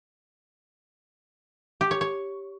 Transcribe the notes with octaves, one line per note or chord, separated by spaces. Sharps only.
G4
C#5
C#5